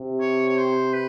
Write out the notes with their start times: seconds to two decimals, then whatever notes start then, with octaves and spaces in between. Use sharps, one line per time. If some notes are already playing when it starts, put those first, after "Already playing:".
Already playing: C3
0.20 C#5
0.49 C#5
0.57 C5
0.93 B4